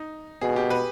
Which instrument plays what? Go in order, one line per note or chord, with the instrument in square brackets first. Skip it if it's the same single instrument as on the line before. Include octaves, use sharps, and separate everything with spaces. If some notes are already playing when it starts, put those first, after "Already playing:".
Already playing: [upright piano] D#4
[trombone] B2 [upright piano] G#4
[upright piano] G4
B4